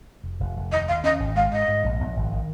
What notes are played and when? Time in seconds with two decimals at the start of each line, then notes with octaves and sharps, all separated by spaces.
0.24 F1
0.40 F1
0.56 F1
0.72 D#2 D#5
0.88 D#2 F5
1.04 C#4 D#5
1.20 G#1
1.36 G#3 F5
1.52 G#2 D#5
1.68 G#2
1.84 A#1
2.00 A#1
2.16 G#1
2.32 D#3